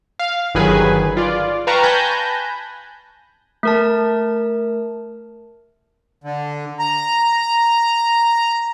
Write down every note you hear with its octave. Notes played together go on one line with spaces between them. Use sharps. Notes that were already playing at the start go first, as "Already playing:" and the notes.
F5
G1 D#3 F#3 G#4 B4 G#5
F4 D5
B4 F5 G5 A5 A#5 C#6
G#5 A5 B5 F#6 G6 A#6
A3 A#4 A5
D3
A#5